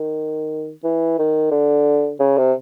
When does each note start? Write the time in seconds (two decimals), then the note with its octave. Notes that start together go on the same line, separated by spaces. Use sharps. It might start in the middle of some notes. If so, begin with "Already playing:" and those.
Already playing: D#3
0.84 E3
1.19 D#3
1.51 D3
2.20 C#3
2.38 C3